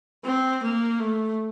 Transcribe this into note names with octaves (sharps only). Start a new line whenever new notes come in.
C4
A#3
A3